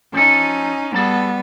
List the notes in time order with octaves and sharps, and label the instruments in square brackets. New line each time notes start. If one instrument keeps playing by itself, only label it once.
[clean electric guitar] F3 A4 [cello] C#4 D#4
[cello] G3 B3 [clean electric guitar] G#4 A4 A5